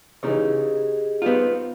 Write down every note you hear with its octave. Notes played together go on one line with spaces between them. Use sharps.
C#3 E3 D#4 G4 G#4 D#5
G3 B3 C4 D#4 F4